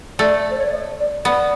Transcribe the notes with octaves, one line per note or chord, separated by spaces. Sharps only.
A3 D5
C5
C#5
D5
D#5
D5
B3 D5